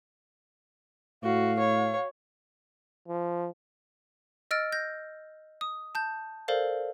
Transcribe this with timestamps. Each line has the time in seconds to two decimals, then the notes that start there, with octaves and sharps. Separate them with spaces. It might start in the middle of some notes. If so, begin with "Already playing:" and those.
1.23 A2 F#4 F5
1.59 C#5
3.08 F3
4.51 D#5 E6 F6 A6 D7
4.72 G6 A#6
5.61 D#6
5.95 A5 G6
6.48 A4 A#4 C5 D5 F5